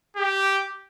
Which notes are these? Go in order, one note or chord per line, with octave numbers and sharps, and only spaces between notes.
G4